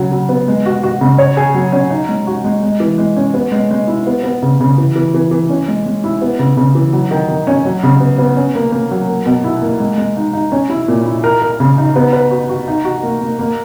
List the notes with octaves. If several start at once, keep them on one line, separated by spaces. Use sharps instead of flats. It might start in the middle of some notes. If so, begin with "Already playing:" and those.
Already playing: C#3 F#3
F#3
B3
G#3
F#4
F#4
C#3
C#5
G#4
F#3
C#4
D#4
G#3
F#4
G#3
G#3
E3
G#3
C#4
B3
G#3
G#3
E4
B3
B3
C#3
C#3
E3
E3
E3
E3
C#4
G#3
G#3
E4
B3
C#3
C#3
E3
F#3
D#3
D#3
C#4
F#3
C#3
B3
B3
C#4
A#3
A#3
F#3
A#3
B2
E4
A#3
G#3
G#3
D#4
D#4
C#4
E4
A#2
E4
A#4
A#4
C#3
D#4
B3
B4
F#4
F#4
D#4
F#4
A#3
A#3
A#3